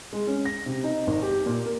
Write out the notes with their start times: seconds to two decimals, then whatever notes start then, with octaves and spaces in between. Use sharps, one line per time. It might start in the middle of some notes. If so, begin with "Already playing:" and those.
0.13 G#3
0.27 C#4
0.45 A#6
0.66 C3
0.84 D#4
1.07 G#1
1.23 G4
1.46 A#2
1.66 A#4